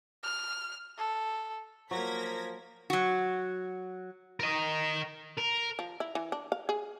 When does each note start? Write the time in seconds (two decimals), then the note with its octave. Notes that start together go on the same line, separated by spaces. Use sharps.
0.23 F6
0.98 A4
1.91 F3 F#3 A#3 A#4 G#6 A#6 B6
2.90 F#3 F#4
4.40 A#4 D#5
5.38 A#4
5.79 F3
6.00 E4
6.15 E3
6.32 D4
6.52 F5
6.69 G#4